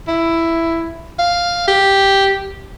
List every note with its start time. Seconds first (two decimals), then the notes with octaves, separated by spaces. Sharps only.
0.08 E4
1.19 F5
1.68 G4